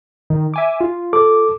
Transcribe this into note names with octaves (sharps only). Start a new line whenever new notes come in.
D#3
E5 G#5 D6
F4
A4 D6